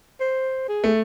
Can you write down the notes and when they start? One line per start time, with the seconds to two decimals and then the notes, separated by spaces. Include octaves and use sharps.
0.20 C5
0.68 G#4
0.84 A3